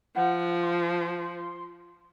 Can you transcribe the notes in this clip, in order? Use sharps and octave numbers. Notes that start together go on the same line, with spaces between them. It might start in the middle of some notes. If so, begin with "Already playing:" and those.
F3 F#5
C6